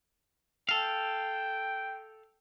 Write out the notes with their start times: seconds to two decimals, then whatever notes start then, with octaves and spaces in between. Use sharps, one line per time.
0.69 A4 F5 G5